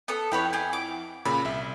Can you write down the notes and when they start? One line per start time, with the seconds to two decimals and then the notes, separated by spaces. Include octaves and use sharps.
0.08 B3 A4 D#6
0.32 F2 E4 G4 B4 C#5 F#5
0.53 G4 G#4
0.73 D6
1.25 A#2 C#3 B5
1.45 C2 E5